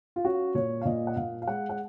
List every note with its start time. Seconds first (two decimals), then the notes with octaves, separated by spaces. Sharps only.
0.16 F4
0.25 C#4 F#4
0.55 A#2 C#5
0.81 F5
0.85 A#2 D#5
1.07 F#5
1.16 A#2 F5
1.42 F5
1.47 G#3 F#5
1.70 F#5